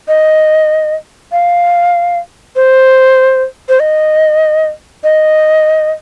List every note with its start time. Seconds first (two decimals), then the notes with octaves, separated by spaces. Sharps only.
0.08 D#5
1.32 F5
2.56 C5
3.69 C5
3.80 D#5
5.04 D#5